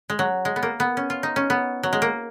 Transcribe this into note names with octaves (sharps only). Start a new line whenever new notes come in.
G#3
F#3
G#3
B3
A#3
B3
C#4
F4
D#4
C#4
B3
F#3
G#3
A#3